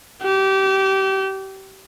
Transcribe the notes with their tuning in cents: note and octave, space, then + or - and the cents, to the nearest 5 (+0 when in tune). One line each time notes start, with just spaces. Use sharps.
G4 -25